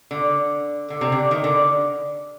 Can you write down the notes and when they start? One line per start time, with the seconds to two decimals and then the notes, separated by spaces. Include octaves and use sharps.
0.11 D3
0.90 D3
1.01 C3
1.12 D3
1.31 D#3
1.44 D3